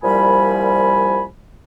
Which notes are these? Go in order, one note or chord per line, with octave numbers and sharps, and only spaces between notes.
C2 A#2 F3 G3 G#5 B5